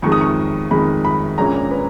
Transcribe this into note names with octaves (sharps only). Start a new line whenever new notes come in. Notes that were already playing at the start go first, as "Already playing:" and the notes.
F2 D#3 G#3 C#6
D#6
C#6
F2 D#3 G#3 B5
B5
A#1 A#2 G#3 C#4 A#5
B4